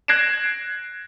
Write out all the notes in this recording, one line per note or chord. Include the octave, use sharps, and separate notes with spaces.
F#6 G#6 A#6 C7 D7 E7